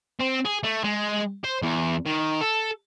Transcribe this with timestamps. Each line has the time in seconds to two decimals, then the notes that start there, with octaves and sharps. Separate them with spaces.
0.20 C4
0.45 G#4
0.64 A3
0.84 G#3
1.44 C5
1.62 E2
2.06 D#3
2.41 A4